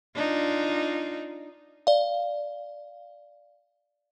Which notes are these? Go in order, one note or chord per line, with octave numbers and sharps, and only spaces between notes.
D4 D#4 F4
D5 F5